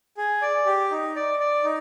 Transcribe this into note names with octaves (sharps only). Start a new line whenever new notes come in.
G#4
D5
G4
D#4
D5
D5
D#4